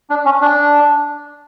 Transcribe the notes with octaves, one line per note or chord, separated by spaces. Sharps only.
D4
C#4
D4